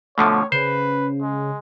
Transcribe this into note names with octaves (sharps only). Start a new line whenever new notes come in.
B2 D3 F3 A3 C#5
C#3 B4 C5
G#3